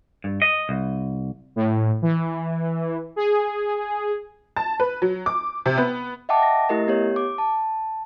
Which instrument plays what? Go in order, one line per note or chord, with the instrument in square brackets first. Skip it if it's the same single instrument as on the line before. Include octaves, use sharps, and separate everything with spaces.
[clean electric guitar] G2
D#5
C2
[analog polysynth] A2
E3
G#4
[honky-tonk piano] A5
B4
F#3
D6
C3
B3
[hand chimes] D#5 E5 F#5 G5 A5 D6
A#6
A3 E4 G4 A#4 D#5
B3 G4 C#5
D6
A5